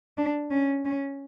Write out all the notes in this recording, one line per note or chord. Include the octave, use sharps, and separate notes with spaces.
D4
C#4
C#4